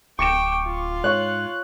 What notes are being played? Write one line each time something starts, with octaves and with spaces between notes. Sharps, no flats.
D1 G5 C#6 D6 C#7 E7
F4
G#2 C#5 C#6 F#6